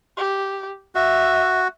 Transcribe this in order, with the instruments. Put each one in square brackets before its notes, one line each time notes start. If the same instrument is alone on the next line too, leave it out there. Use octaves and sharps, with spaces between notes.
[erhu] G4
[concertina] F#4 [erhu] E5